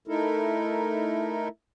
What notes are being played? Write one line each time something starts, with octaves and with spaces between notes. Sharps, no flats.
A3 D#4 E4 A4 A#4